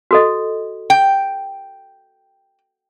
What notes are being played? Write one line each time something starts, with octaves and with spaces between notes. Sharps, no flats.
F#4 A4 D#5
G5